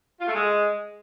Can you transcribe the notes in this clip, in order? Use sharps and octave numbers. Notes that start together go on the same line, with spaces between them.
F4
A3
G#3